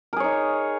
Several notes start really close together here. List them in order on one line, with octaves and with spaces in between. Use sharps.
A#4 G#4 C#5 D#4